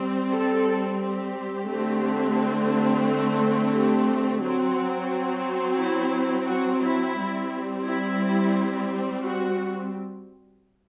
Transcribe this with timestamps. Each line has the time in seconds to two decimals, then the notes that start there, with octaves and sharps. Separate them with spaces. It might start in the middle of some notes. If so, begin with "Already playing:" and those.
Already playing: G3 C4
0.32 A4
1.00 G4
1.69 D3 A3 C4
3.75 G4
4.43 F#3 C4 F#4
5.79 E4
6.48 F#4
6.82 E4
7.17 G3 C4
7.85 E4
9.22 F#4